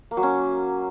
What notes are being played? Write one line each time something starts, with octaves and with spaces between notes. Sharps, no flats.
A#3
F#3
C#4